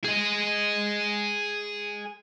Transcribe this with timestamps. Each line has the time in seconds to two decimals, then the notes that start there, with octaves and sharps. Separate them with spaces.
0.04 G#4 D#5